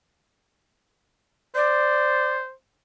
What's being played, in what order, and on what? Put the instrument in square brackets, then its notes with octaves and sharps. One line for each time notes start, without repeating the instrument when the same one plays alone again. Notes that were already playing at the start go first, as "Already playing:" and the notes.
[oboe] C5 [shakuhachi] D5